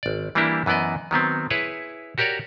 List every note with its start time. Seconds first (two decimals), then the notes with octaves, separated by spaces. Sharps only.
0.03 G#1 D5
0.35 E3 G3 A#3 D4 E4 G4
0.66 F#2 E3 B3 D5 D#5
1.11 D#3 F#3 B3 C4
1.50 E4 G#4 B4 C#5
2.18 F#4 G4 A#4 C#5 D5